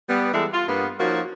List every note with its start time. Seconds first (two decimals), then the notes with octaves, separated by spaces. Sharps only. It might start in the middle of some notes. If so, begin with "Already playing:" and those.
0.09 G3 B3
0.33 E3 G3 G#3 A4 E5
0.53 F4
0.68 G2 A#3 B3
0.99 F3 A#3 C#4 D#4 F#4